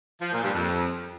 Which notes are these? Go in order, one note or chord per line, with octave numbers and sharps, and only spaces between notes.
F3
A#2
G2
F2